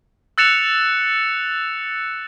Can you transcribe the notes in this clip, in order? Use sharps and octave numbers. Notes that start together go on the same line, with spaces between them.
E6 F#6 A6 C#7 E7 F7